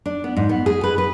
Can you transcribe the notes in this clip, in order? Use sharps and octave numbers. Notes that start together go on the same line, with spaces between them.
D4
B3
G#2
B3
G#4
B4
B4